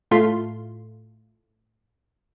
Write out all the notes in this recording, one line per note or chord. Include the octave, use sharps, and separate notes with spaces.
A2 A3 F4 C6 B6